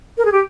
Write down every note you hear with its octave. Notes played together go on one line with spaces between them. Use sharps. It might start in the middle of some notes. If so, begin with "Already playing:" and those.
A#4
G#4
G4